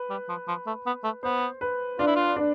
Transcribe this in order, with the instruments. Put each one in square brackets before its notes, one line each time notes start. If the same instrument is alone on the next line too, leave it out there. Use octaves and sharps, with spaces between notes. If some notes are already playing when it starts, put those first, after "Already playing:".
Already playing: [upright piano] B4
[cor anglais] G3
F3
F3
A3
B3
A3
[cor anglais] B3 [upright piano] C5
[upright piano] B4
[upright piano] D4 [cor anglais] F4
[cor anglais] E4
F4
[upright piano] D4